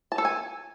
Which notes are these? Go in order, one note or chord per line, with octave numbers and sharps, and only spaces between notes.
A5
A4
G#5